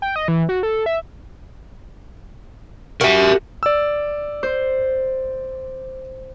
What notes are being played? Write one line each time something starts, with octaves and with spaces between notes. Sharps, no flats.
G5
D#5
E3
F#4
A4
E5
F#4 G4 A#4 E5
D5 E6
C5